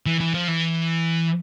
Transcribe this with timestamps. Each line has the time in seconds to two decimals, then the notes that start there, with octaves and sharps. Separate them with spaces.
0.06 E3
0.20 E3
0.34 F3
0.48 E3